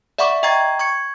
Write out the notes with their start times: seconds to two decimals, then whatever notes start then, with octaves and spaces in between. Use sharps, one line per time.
0.18 D5 E5 F#5 B5 C#6 D6
0.43 D#5 G5 A#5 C#6 G#6 A6
0.79 C#6 G#6 C#7